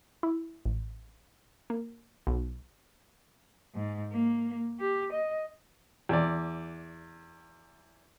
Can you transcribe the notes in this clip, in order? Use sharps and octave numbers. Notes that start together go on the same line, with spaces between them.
E4
A1
A#3
B1
G#2
A#3
G4
D#5
E2 D5